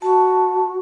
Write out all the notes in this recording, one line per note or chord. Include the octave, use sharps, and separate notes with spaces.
F#4 A5